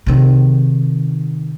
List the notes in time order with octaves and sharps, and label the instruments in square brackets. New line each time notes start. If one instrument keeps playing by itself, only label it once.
[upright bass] C3 D#3